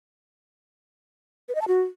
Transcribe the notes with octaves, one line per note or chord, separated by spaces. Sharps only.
B4
D#5
A5
F#4